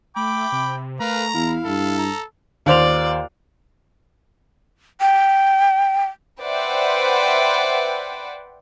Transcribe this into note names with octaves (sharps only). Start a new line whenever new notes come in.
A3 G5 B5 D6
C3
A3 A#4 B4 F5 A#5
E2 E4 F5
G2 A4
A#5
D#2 F4 C5 D5 F7
G5
B4 C5 D5 E5 F#5 G5